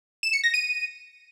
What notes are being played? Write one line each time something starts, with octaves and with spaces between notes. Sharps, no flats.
E7
C#7
A#6
D#7